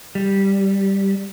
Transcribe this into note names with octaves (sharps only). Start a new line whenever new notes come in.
G3